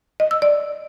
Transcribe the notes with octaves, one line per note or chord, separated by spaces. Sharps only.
D#5
E6
D5